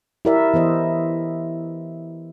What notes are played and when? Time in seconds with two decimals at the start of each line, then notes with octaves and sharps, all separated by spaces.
0.25 E4 G4 A#4 D5 E5
0.54 E3 B3 C5 D#5